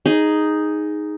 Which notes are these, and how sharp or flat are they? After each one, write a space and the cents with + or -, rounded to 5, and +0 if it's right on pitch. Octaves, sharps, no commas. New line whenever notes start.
D#4 +0 G#4 +0